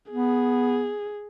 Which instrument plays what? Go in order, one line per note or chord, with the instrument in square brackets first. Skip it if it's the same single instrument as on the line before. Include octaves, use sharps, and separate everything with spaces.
[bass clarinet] B3 [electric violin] G#4